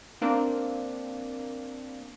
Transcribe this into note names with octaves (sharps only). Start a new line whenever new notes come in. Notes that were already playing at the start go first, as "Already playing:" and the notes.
A#3 C4 D4